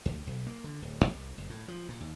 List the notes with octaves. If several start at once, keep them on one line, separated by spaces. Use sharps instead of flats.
D2
B1
A#3
D3
D1
C2
F#1
A2
F3
A#2
D#2